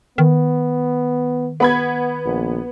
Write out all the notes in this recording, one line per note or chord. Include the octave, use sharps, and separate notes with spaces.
D#3 B3
B3 B5 G#6
A#1